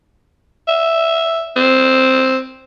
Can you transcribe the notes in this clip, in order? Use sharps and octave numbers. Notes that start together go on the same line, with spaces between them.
E5
C4